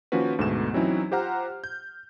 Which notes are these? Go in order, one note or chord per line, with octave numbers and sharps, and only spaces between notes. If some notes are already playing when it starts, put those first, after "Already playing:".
D#3 F3 A#3 C#4 F#4 B4
D2 G#2 B2 A3 B3 E7
E3 F#3 C4 C#4 D#4 E4
F4 G4 C5 F#5 A#5 F6
G6